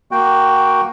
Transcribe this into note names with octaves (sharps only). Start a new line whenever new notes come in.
A#3 F#4 G5